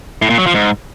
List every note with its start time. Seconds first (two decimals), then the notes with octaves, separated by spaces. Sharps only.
0.22 A2
0.30 A#2
0.38 F#3
0.46 F3
0.54 G#2